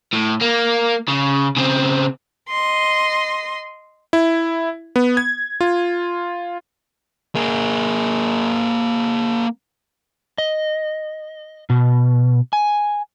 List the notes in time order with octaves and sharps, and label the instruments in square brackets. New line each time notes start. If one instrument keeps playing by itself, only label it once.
[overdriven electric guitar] A2
A#3
C#3
C#3 C4
[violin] D#5 C6
[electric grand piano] E4
B3
G#6
F4
[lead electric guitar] A#3 G#4
[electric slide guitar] D#5
B2
G#5